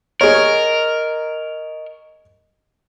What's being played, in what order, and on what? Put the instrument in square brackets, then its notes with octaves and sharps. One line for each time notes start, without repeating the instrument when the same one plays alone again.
[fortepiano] G#4 C#5 [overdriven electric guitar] A#4 [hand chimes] D#5 C#6